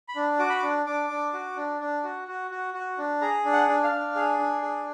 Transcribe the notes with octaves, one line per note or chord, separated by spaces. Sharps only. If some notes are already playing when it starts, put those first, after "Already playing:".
B5
D4
F#4 D6
B5
D6
D4
D4 D6
D4
F#4
D4
D4
F#4
F#4
F#4
F#4
D4
G#4 A#5
D4
F#5
D4
F5
D4
G#4
D4
G#4